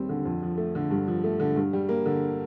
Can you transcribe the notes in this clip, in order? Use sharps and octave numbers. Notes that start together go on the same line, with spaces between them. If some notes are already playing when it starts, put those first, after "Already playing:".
Already playing: D#2 G3 C4
D3
F2
F3
A3
D3
G2
F3
A3
D3
G2
G3
A#3
D3